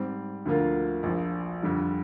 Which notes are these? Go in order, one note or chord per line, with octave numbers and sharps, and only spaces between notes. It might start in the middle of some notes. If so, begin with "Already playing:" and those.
Already playing: G#2 G3 C4
D2 D3 F3 A#3 F4
A#1 A#2 F3
F2 D3 G3